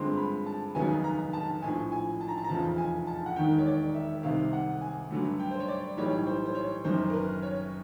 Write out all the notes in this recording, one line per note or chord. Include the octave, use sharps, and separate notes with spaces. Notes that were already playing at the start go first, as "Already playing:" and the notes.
Already playing: G2 D3 F3 G#3 C4 C6
B5
A5
F1 D#2 C#3 F#3 B3 G#5
A#5
A5
A#1 A2 F3 G#5
G#5
A5
A#5
A5
A#5
F1 E2 C#3 F3 A5
G#5
A5
F#5
E1 D#2 D#3 G5
C#5
D5
E5
C2 C3 D#3 F5
F#5
G#5
G2 D3 F#3 A3
G5
C5
C#5
D5
B1 A2 E3 G3 C#5
C5
C5
C#5
F#1 F#2 D#3 C5
A#4
B4
C#5